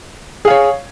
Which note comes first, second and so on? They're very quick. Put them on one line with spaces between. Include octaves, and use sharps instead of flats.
G#4 F5 C#5